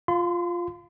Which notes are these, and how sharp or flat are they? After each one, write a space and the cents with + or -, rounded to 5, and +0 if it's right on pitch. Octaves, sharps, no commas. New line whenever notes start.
F4 +0 C6 -40